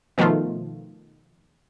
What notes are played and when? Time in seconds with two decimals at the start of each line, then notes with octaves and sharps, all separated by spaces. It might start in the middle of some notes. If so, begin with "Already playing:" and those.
0.18 B2 D#3 F3 A3 F4